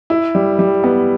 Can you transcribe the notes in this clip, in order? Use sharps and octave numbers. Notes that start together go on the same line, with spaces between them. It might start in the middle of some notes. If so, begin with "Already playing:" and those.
E4
G3
G3
B3